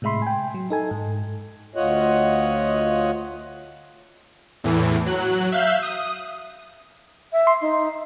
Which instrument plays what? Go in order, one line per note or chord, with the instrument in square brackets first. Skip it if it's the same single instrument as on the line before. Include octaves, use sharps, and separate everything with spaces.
[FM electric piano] A2 C3 G#3 E5 B5 C6
G5 G#5
F#3
D#4 A4 G#5
G#2
[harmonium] D2 F4 C#5 D#5 F#5
[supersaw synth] E2 A2 E3
F#3 F#6
E5 F5 F#6 G6
D#6
[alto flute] E5
[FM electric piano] C6
[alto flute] D#4